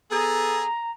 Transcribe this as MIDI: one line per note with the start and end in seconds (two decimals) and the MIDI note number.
0.11 0.66 59
0.11 0.66 68
0.11 0.66 69
0.11 0.90 82